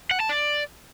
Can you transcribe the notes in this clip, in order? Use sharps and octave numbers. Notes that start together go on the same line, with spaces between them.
F#5
A5
D5